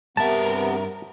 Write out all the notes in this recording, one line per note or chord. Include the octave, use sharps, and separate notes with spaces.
G2 C3 B3 A#4 E5 A5